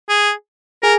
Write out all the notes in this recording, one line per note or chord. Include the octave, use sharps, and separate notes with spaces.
G#4
G#4 A#4 G#5